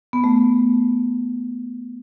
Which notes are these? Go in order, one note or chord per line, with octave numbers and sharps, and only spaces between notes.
B3
A3